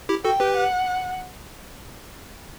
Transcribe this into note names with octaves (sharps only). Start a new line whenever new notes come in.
E4 G4
F#4 A4 G5
G4 B4
F#5